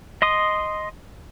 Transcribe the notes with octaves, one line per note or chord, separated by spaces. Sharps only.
D#5 C6 D#6